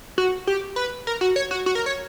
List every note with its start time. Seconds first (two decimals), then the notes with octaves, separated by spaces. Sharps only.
0.18 F#4
0.47 G4
0.76 B4
1.07 A#4
1.21 F#4
1.36 C#5
1.51 F#4
1.66 F#4
1.75 A#4
1.86 C#5